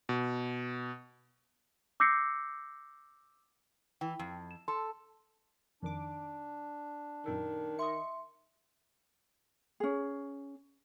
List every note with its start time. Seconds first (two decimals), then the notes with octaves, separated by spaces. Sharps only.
0.09 B2
2.00 D6 E6 G6 A#6 C7 C#7
4.01 E3 G5
4.19 F2
4.51 E7
4.68 A4 C6
5.82 F2 D#3 D4 D6
7.26 F#2 A#2 D#3 A4
7.79 D#5 E5 C6 C#6 C#7
9.80 C#4 G#4